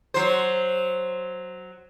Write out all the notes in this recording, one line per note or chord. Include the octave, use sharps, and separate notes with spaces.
F#3 C5